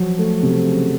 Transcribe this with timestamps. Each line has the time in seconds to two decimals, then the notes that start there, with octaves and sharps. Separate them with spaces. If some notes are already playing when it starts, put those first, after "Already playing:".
Already playing: F3 F#3
0.18 A3
0.43 C3
0.67 C#3